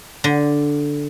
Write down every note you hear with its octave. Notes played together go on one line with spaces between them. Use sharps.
D3